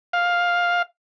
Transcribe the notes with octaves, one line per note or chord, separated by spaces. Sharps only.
F5